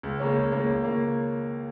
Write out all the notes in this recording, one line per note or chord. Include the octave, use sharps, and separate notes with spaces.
C#2
C#3 A#3 C#4
C#2
C#3 A#3 C#4
C#2
C#3 A#3 C#4